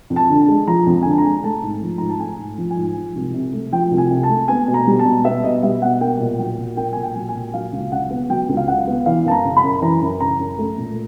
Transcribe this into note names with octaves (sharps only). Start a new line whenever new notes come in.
F2
A5
D3
A5
G#3
F3 A#5
F2
G#5
D3
A5
A#5
G#3
A3 A5
G#2
F3
G#2 A#5
A5
A3 G#5
G#2
F3
G#5
G#2
F3
C2
C3
A3
F3 G5
C2
G#5
C3
A5
A3
B3 G#5
B2
A#5
G3
A5
B2
B3 E5
B2 D#5
G3 E5
B2 F#5
A#3 G5
A#2
F#3 G5
A#2
A#3 G5
A#2 G#5
G5
F#3
G#5
A#2
F#3 F5
C#2
C#3 F#5
B3
F#3 G5
C#2
F5
C#3 F#5
B3
E3 F5
F#2 A5
A#5
C#3
B5
F#2
E3 A#5
F#2
C#3 A#5
F#2
A3
A#2